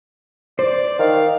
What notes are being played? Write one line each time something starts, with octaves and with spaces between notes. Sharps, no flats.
C5 D5
D#3 F5